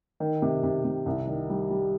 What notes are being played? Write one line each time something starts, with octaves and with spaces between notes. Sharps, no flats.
D#3
C3
C3
C3
C2
D#3
G3
G3